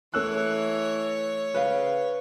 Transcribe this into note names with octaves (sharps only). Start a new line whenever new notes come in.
E3 A3 C#5 E6 F#6
C#3 B4 F5